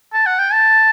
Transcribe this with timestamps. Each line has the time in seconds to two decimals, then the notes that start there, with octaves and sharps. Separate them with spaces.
0.13 A5
0.26 F#5
0.39 G5
0.53 A5